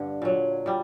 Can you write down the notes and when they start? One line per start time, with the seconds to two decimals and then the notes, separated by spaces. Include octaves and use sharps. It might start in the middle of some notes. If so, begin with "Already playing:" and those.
Already playing: G2 D3
0.22 A#2 F#3
0.66 A#2 G3